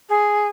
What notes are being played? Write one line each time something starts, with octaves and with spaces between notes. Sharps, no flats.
G#4